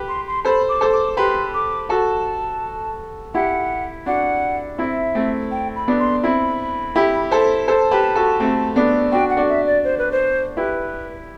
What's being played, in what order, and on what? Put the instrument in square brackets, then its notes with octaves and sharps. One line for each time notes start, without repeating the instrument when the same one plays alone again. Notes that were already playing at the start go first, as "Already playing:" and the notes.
Already playing: [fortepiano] G4 B4
[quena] C6
C6
[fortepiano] A4 C5 [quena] B5
[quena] D6
[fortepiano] A4 C5
[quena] D6
[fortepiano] G4 B4 [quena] C6
[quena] D6
[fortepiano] F#4 A4 [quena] A5
[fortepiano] E4 G4 [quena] F#5
[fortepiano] D4 F#4 [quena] F#5
[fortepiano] C4 E4 [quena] E5
[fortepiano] A3 C4
[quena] G5
B5
[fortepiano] B3 D4
[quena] C6
[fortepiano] C4 E4 [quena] B5
[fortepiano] E4 G4
A4 C5
[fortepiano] A4 C5 [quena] A5
[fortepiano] G4 B4
F#4 A4
A3 C4
B3 D4
[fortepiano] D4 F#4 [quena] G5
[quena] F#5
[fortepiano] D4 F#4
[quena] E5
D5
C5
B4
C5
[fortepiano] E4 G4 [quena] B4